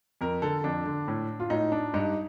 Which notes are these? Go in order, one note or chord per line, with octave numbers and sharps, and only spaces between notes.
F2 A#4
D3 A4
F2 D4
D3
A2
F4
A2 D#4
D4
G2 D#4